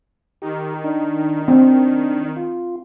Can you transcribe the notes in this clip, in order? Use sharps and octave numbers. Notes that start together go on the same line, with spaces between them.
D#3 G4
D4 D#4
C4 D4
F4